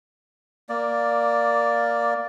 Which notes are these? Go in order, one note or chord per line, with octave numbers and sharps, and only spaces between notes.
A#3 D5